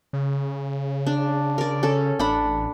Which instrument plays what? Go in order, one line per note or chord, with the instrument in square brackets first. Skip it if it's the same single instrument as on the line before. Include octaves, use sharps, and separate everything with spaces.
[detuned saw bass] C#3
[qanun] D4
A#4 D5
C#4 A4
[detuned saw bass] A1 [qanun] D4 F#5 B5